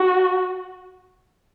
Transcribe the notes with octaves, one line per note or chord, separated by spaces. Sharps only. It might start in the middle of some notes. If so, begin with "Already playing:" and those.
Already playing: F#4